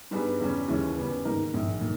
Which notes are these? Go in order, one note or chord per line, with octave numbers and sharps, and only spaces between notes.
G2 G3 B3 D#4 G#4
E2 C#3 G3 C#4
D#2 C#3 E3 G#3 C#4
C#3 G3 B3
G#2 D#3 A#3 D#4 A#4
A#1 G#2 D#3
A#2